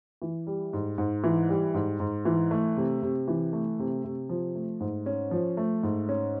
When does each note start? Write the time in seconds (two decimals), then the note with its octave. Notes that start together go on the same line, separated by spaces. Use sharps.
0.22 E3
0.47 G3
0.73 G#2
0.98 G#2
1.24 E3
1.49 G3
1.74 G#2
2.00 G#2
2.25 E3
2.51 A3
2.77 C3
3.02 C3
3.28 E3
3.53 A3
3.79 C3
4.04 C3
4.29 F3
4.55 A3
4.80 G#2
5.06 C#4
5.31 F3
5.57 A3
5.83 G#2
6.09 C#4